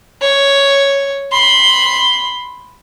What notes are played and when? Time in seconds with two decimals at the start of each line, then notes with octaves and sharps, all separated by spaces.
0.22 C#5
1.32 B5 C6